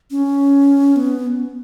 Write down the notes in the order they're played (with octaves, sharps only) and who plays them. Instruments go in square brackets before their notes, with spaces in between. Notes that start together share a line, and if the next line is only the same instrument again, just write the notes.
[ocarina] C#4
B3